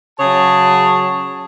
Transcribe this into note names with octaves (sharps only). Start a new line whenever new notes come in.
C#3 F#3 G#4 C#5 A5